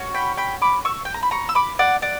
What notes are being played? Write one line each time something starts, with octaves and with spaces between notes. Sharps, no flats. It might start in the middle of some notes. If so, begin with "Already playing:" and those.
Already playing: C#4 F#4
G5 B5
G5 B5
B5 D6
C#6 E6
G5
A#5
B5
A#5 C#6
E6
B5 D6
D5 F#5
D5 F#5